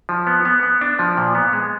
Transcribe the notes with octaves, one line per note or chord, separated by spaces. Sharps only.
F3
B3
B3
B3
D4
F3
A#2
B3
G#3